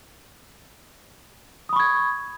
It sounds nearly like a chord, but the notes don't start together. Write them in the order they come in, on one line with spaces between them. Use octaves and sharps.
D#6 B5 C#6 G#6